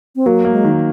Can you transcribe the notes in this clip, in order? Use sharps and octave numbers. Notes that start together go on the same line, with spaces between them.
C4
F#3 A#3
A#3
G#3
D#3